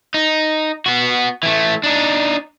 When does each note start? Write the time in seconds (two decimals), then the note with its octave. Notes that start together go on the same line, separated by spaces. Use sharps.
0.14 D#4
0.86 B3 F#4
1.43 E3 A3
1.84 D4 D#4